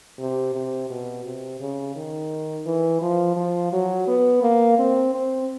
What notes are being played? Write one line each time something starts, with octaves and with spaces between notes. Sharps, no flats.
C3
C3
B2
C3
C#3
D#3
E3
F3
F3
F#3
B3
A#3
C4
C4